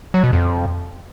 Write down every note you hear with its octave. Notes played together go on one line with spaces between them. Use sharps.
F#3
B2
F2